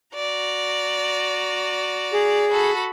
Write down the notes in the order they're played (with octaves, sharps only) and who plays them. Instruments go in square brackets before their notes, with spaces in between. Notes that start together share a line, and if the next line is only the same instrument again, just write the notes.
[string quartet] F#4 D5 A#5
[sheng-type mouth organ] G#4
[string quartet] F#4 A4 B5